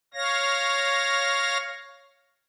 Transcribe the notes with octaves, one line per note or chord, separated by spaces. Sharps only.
C#5 F5 A#6